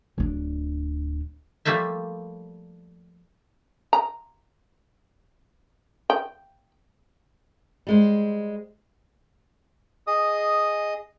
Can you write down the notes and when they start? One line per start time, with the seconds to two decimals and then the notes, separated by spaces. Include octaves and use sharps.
0.18 D1 D4
1.65 F3 G3 A3 A#3 C5 E5
3.93 A#5
6.10 G5
7.87 G3 G#3 C5
10.07 G#4 D#5 D#6